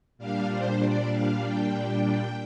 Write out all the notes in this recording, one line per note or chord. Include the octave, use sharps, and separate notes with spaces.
A#2 G3 D4 F5
C5
D5
F5
G5
G5